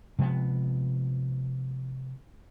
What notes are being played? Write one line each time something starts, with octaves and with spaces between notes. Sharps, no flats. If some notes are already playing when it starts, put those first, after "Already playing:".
C3 F3 G#3 B3